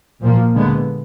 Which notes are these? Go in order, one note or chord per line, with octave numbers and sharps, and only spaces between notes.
A#2 F3 A#3
D3 G#3 B3